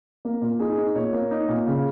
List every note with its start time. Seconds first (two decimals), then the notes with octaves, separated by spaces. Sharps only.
0.25 A#3
0.42 A#2
0.59 D#4 G#4
0.77 D#4
0.95 A#2 C#5
1.13 A#3
1.31 D#4
1.48 A#2
1.67 C#3